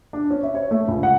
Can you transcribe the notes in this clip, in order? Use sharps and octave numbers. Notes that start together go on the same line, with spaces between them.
D4
C#4
E5
C#5
A3
C#2
F#5